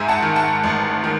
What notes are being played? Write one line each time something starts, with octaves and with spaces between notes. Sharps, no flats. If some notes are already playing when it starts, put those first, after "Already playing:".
Already playing: G#2 E5 G#5
F#5 A5
D#3
F#5 A5
A1
D#3